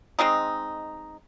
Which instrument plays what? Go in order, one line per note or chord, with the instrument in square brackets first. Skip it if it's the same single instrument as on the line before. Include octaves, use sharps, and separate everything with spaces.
[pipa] G#3 C4 D#4